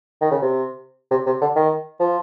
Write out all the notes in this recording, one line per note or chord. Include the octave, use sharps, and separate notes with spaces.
D#3
C#3
C3
C3
C3
D3
D#3
F3